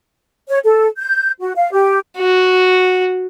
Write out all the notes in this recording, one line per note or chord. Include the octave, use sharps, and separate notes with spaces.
C#5
A4
G6
F#4
F5
G4
F#4